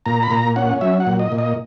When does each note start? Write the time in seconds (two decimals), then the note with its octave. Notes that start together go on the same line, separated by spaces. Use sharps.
0.06 A#2 A#5
0.23 B5
0.31 A#2 A#5
0.56 C#4 F#5
0.81 F#3 E5
1.00 F#5
1.07 A#2
1.19 D#5
1.32 A#2
1.38 D#5